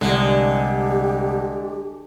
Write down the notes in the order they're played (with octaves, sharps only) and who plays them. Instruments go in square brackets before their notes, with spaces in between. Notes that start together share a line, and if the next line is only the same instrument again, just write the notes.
[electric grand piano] C2 [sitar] D3 [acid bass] G#3 [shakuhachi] G4